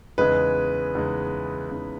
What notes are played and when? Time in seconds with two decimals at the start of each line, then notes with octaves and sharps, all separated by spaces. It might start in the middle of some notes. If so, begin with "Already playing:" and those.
0.18 E2 C#3 G#3 D#4 B4
0.95 E2 C#3 G#3 D#4
1.71 E2 C#3 G#3 D#4